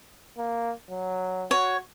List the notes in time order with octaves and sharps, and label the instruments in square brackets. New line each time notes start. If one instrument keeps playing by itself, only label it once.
[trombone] A#3
F#3
[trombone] F#4 [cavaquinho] C#5